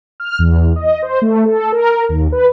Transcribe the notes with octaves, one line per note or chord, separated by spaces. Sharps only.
F6
E2
D#5
C5
A3
A4
A#4
D#2
B4